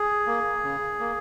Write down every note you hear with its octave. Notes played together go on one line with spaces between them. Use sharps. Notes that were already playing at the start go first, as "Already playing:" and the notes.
Already playing: G#4
A#3
C#3
A#3